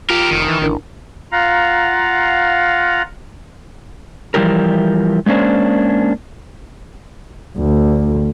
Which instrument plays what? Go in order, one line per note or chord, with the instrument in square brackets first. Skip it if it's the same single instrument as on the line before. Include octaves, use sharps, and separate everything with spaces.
[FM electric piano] F4 [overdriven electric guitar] G4 A#4
[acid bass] F1 [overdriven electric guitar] D#3
[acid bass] E3 [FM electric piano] A6
[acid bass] A1 [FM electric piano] D4 E4 A#4
[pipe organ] F4 F5 F#5 A#5
[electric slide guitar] E3 F3 G3 E4 G4 A#4
G#3 A#3 C#4 D4 C5
[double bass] D2